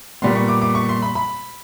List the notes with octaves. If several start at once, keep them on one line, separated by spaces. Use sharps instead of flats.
A#2 G3 B3 C6
C#6
D6
D6
C#6
C6
B5
B5